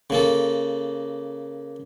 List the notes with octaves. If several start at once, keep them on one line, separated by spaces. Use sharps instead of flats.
C#3 A#3 A4